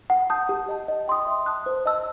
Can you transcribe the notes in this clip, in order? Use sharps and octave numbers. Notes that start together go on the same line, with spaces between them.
F#5
A5 D#6 G6
G4
D#5 A5
D#5
G5 C6 D#6
E5
A5 D#6 F#6
C5
D#5 A5 E6